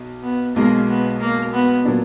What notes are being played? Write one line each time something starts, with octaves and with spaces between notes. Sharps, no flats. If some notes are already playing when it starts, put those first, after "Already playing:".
Already playing: B1
B3
B1 B2 G#3 A#3
B3
A#3
B3
A#2 F#3 D4